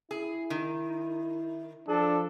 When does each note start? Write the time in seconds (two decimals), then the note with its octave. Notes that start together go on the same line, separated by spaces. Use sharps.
0.11 E4 G#4
0.50 D#3
1.88 F3 D4 A4